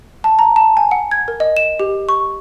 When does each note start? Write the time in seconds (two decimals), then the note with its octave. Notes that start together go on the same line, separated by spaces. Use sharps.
0.24 A5
0.39 A#5
0.56 A5
0.77 G#5
0.91 F#5
1.11 G#6
1.28 A#4
1.40 D#5
1.57 E7
1.80 G4
2.09 C#6